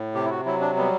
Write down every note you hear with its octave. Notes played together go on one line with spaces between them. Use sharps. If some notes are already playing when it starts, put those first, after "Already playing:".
Already playing: A2
C3 G4
E4
F#4
F#3 E4
D4
G3 B3